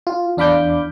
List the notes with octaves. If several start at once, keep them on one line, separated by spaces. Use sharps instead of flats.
F4
E2 D4 F5 B5 D6 G6